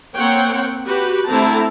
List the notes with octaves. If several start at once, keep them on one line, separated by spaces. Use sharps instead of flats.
A#3 C4 C#5 F#5 G5
F#4 G4 B4
D3 A3 C4 E4 A5 A#5